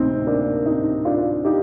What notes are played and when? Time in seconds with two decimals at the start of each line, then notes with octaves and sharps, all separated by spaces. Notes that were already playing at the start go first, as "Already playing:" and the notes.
Already playing: D2 C3 C4 D#4
0.26 A#3 D4
0.66 C4 D#4
1.05 D4 F4
1.45 D#4 G4